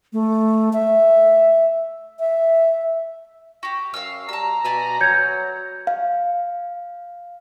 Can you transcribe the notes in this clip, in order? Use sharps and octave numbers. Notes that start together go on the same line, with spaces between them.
A3
E5
E5
F#4 G4
F#2 F5 E6
G3 A5 A#5 E6
B2 D5 G#5 B5
F#3 G6 G#6 C#7
F5